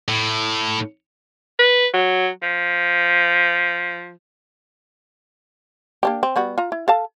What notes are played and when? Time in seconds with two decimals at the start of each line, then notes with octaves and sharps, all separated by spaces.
0.09 A2
1.59 B4
1.94 F#3
2.43 F3
6.03 A#3 D4 G4
6.23 C4
6.36 G3 B3 F#4
6.58 F4 A#5
6.72 E4
6.88 A4 F5 A5